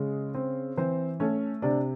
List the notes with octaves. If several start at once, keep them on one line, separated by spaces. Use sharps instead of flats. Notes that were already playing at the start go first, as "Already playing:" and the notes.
Already playing: C#3 G#3
C4
E3 C4 C5
A3 C#4 C#5
C3 D4 D5